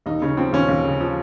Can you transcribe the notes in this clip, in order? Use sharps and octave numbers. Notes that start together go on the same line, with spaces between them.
D#2 D#4
C#3 C#4
F3 C4
D#2 C#4
D#2
C#3
F3